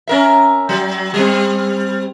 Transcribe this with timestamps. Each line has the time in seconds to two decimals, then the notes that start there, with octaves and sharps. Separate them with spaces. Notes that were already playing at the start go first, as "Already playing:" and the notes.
0.08 C#4 A#4 E5
0.69 F#3
1.14 G3 C4